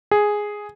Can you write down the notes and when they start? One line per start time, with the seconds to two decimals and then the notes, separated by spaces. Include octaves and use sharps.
0.11 G#4